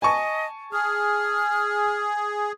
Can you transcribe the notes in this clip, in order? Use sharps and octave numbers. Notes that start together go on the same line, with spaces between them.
D#5 G#5 A5 C#6
G#4 F6